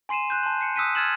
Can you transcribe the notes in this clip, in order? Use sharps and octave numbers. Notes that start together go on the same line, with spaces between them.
G#5 C6 C7 D#7 E7
F#6 G6
A5 C6
C7 C#7
D#6 E6 F#6 B6 C#7 D#7
E6 F6 G#6 A6 E7 F#7